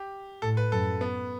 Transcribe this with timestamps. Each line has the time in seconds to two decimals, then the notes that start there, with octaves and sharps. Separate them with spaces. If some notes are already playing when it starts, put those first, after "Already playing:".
Already playing: G4
0.42 A2 A4
0.57 B4
0.71 F#2 A4
1.01 B3